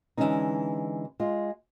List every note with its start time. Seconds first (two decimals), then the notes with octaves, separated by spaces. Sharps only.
0.17 D3 E3 F3 G#3 C#4 D#4
1.20 G#3 F4